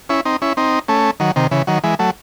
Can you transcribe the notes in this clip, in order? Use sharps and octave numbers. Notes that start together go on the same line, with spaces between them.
C#4 E4
C4 D#4
C#4 E4
C4 D#4
A3 C#4
D#3 F#3
C3 D#3
C#3 E3
D#3 F#3
E3 G#3
F#3 A3